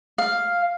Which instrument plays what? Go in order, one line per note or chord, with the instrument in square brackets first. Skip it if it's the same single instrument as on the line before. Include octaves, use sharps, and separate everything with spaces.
[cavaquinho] F5